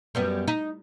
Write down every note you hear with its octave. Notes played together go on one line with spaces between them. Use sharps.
F#2 G3 B3
D#4